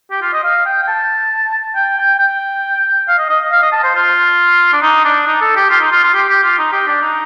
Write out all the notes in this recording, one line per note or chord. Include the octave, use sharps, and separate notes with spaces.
G4
F4
D#5
F5
G5
G5
A5
G5
G5
G5
F5
D#5
D#5
F5
D#5
A5
C5
F4
D4
D#4
D4
D#4
A4
G4
F4
D#4
F4
F4
G4
G4
F4
D#4
G4
D4
D#4